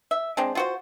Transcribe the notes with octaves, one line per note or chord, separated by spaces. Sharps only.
E5
G#3 C4 D4
F4 F#4 C5